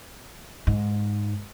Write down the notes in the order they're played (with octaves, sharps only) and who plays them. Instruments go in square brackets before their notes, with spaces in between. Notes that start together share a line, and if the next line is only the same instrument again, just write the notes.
[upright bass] G#2